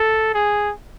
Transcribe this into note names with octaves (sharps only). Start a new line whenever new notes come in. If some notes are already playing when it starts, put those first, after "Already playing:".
Already playing: A4
G#4